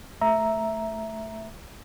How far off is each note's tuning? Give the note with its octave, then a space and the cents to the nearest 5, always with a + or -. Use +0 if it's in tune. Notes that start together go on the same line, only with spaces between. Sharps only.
A3 +0 E5 +0 A#5 +0